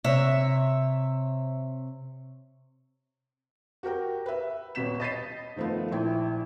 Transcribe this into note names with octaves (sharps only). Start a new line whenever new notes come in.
C3 C#5 E5
F#4 G4 A#4 G5
B4 E5
D#1 B2 B3 B6 E7
D#5 B5 A6 B6 C7 D#7
D#3 F3 A3 B3 F4
A#1 E4 G5